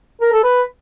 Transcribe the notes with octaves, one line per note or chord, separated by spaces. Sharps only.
A#4
A4
B4